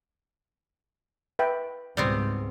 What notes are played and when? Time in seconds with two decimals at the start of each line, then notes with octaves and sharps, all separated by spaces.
1.39 B4 E5 G5
1.97 C#2 G#2 G3 B3 C4